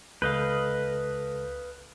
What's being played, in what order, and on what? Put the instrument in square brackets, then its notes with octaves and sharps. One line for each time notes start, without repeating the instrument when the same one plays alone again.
[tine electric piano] C#2 A4 G6 [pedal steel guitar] B4 D#5 F5